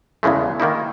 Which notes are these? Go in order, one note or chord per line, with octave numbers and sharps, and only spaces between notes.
E2 C#3 E3 G#3 A3
D#3 A#3 D#4 E4